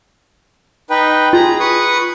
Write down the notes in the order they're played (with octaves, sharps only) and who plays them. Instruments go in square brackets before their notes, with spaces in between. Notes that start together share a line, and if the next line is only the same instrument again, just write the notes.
[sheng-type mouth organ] D#4 B4 G5
[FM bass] F4 [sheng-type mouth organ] G#4 A#5
[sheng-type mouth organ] B4 C#6 D#6